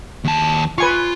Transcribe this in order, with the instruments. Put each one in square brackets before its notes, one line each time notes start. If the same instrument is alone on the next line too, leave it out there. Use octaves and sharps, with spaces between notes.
[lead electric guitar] D#2 A5
[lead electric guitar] F4 [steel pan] B4 G#5 C#6